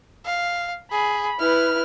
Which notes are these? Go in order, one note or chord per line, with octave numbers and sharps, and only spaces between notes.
F5
G#4 B5
E4 B4 F6